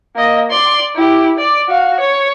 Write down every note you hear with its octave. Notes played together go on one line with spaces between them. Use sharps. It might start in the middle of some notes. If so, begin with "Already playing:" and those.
A#3 D#5
D5 C6
E4 G4
D5
F#4 F5
C#5